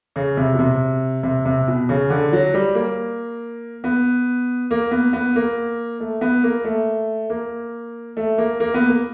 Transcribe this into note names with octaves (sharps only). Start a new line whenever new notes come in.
C#3
C3
B2
C3
C3
C3
B2
C#3
D3
F#3
G3
A#3
B3
A#3
B3
B3
A#3
A3
B3
A#3
A3
A#3
A3
A#3
A#3
B3
A#3